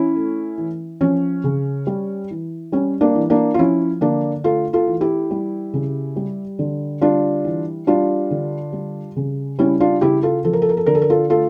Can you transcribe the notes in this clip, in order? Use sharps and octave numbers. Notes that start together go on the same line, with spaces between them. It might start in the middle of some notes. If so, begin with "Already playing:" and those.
Already playing: E3 C#4 E4
A3
E3
F3 C#4
C#3
G3
E3
G3 C#4
A#3 D4
E3
A#3 D4
F4
F3 C#4 E4
D3 A#3 D4
A3 F4 A4
F4 A4
E3
E4 G4
G3
C#3
G3
D3
G3 D4 F4
E3
G3 D4 F4
D3
G3
C#3
G3 C#4 E4
D4 F4
C#3 E4 G4
F4 A4
F3 A4
A#4
A4
A#4
A4
D3 A#4
A4
A#4
F4 A4
A3 F4 A4